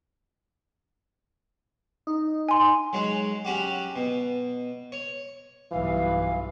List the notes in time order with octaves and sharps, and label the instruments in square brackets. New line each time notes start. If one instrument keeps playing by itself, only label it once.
[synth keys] D#4
[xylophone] G#5 C6
[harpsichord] F#3 G#3 C#5
F#3 C#4 F#4 G4
B2
C#5
[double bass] B1 G2 [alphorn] E3 [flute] F5